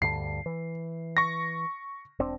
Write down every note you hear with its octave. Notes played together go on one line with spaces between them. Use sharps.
D2 G2 D3 C7
E3
C#6 A#6
E1 C4 D4